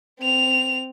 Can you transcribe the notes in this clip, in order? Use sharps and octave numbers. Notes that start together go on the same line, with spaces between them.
C4 F7